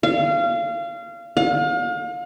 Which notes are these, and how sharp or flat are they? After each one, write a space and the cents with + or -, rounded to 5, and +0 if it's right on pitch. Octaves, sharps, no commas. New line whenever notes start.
F5 -25
F5 +35